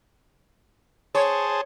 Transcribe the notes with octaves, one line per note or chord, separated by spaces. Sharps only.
G#4 C5 C#5 A5